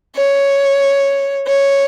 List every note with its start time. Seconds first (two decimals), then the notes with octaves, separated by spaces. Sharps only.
0.16 C#5
1.47 C#5